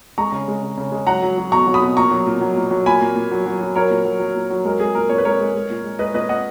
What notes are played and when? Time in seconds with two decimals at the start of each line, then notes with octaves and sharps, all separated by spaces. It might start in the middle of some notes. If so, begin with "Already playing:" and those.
0.18 G#3 A#5 C#6
0.32 C#3
0.48 G#3
0.63 C#3
0.78 C#3
0.92 G#3
1.07 F#3 F#5 A#5
1.22 F#3
1.38 F#3
1.52 B2 A#5 C#6
1.67 F#3
1.74 B5 D#6
1.82 B2
1.97 A#2 A#5 C#6
2.11 F#3
2.27 A#2
2.41 F#3
2.57 A#2
2.71 F#3
2.86 A#2 G#5 B5
3.01 A#2
3.16 A#2
3.31 F#3
3.46 F#3
3.61 F#3
3.76 F#3 A#4 C#5
3.90 A#2
4.05 F#3
4.20 F#3
4.35 A#2
4.50 F#3
4.65 G#3 A#4
4.80 G#3 G#4
4.95 A#2 A#4
5.09 A#2 C#5
5.18 B4
5.25 G#3 A#4 C#5
5.40 G#3
5.55 G#3
5.70 A#2
5.84 G#3
5.99 G#3 B4 D#5
6.14 A#2 B4 D#5
6.29 A#2 D#5 F#5